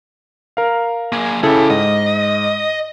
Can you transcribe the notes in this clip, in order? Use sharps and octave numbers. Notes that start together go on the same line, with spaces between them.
A#4 F5
A#3 G#4
C#3 E4 G#4 A4 G5
G#2 D#5